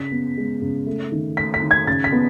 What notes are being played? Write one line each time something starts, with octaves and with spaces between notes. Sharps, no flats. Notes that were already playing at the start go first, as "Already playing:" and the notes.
Already playing: C#3 B6
B3
G#3
C#3
A3
D#3
A3 B6
B6
D#3
G#6
C#3 A6
B6
B3